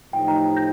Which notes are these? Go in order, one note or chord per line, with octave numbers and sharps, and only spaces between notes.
A2 F3 A3 D#4 G4 G5
G5 A#5
G6 A#6